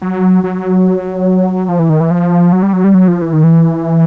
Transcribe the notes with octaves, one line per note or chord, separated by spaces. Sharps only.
F#3
F#3
F3
E3
D#3
E3
F3
F#3
G3
F#3
G3
F#3
F3
E3
D#3
E3